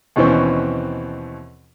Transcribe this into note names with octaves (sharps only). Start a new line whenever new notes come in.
D#2 B2 E3 C4 C#4